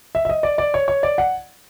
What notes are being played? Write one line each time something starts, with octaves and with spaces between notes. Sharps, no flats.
E5
E5
D#5
D5
D5
C#5
C#5
D5
F#5